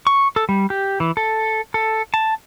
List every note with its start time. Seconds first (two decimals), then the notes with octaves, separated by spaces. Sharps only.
0.07 C#6
0.36 A4
0.49 G3
0.70 G4
1.00 E3
1.17 A4
1.74 A4
2.14 A5